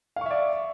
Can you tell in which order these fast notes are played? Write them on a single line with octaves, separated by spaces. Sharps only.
F5 C#6 E5 D5